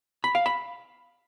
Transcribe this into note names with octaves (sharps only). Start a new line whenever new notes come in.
B5
F5
B5